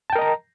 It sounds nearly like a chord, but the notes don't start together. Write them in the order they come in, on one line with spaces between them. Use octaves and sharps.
A5 G5 A#4 D#5 A#5